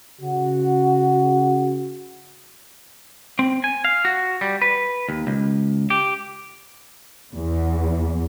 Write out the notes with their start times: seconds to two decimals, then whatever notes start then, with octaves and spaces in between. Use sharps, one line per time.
0.21 C#3 F#4
3.39 C4
3.64 G#5
3.85 F5
4.05 F#4
4.41 G3
4.62 B4
5.09 D#2
5.27 C#2
5.90 G4
7.33 E2